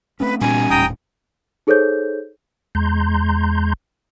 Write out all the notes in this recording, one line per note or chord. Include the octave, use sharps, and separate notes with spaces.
A3 C4 C#4 B4
A#2 G3 B3 C#4 D#4 G#5
D#1 A2 G5 A#5 D#6
D#4 G#4 A4 C5 C#5 G6
E2 G#3 A#5 C6 G6